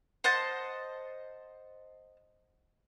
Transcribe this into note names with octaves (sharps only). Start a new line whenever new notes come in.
C5 D#5 F#5 A5